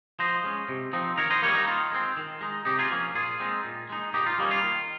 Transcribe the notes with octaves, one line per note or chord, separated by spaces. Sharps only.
F3 C5 D#5
G#3 C#4
C3
F3 C4 D#4
D#3 A#4 C#5
C5 D#5
G3 A#3 A#4 C#5
D#4
D#3 F4
G#3 C4
D#3
G#3 D#4
C3 D#4 G4
F4 G#4
F3 A#3 C#4
A#2 F4 G#4
G#3 C4 D#4
A#2
G#3 D#4
A#2 D#4 G4
F4
G3 A#3 C#4 D#4
F4
D#3